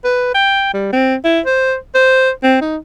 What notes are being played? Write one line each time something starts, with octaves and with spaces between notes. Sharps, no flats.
B4
G5
G3
C4
E4
C5
C5
C4
D#4